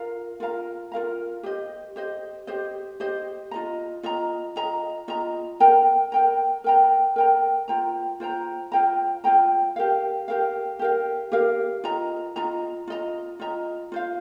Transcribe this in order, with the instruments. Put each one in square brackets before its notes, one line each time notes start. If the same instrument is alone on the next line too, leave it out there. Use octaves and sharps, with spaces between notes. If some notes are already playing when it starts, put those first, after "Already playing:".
Already playing: [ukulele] F4 A#4 F5 A#5
F4 A#4 F5 A#5
F4 A#4 F5 A#5
G4 C5 D#5
G4 C5 D#5
G4 C5 D#5
G4 C5 D#5
F4 D#5 A#5
F4 D#5 A#5
F4 D#5 A#5
F4 D#5 A#5
A#4 G5 A#5
A#4 G5 A#5
A#4 G5 A#5
A#4 G5 A#5
F4 C5 G5 A#5
F4 C5 G5 A#5
F4 C5 G5 A#5
F4 C5 G5 A#5
G4 A#4 F5
G4 A#4 F5
G4 A#4 F5
G4 A#4 F5
F4 D#5 A#5
F4 D#5 A#5
F4 D#5 A#5
F4 D#5 A#5
F4 C5 F5